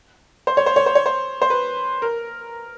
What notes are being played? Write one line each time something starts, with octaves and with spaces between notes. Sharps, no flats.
C5
C#5
C5
C#5
C5
C#5
C5
C5
B4
A#4